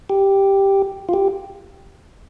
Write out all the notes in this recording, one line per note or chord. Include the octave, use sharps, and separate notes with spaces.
G4
F4
G4